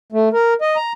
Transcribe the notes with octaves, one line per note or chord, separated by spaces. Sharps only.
A3
A#4
D#5
A#5